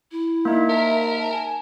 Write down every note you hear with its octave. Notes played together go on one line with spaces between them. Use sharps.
E4
A#3 D#4 E5
A#4 A5
G#5